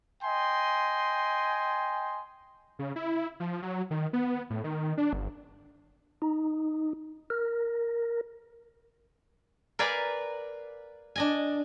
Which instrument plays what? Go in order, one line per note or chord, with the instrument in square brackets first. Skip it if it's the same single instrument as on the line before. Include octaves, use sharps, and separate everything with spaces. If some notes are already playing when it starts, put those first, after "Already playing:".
[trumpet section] D#5 G5 G#5 C6
[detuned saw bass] C#3
E4
F3
F#3
D#3
B3
A2
D#3
D4
G1
[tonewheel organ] D#4
A#4
[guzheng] A#4 B4 D5 F5 G#5 B5
D4 D#5 G#5